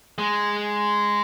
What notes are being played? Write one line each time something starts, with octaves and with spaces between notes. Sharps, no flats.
G#3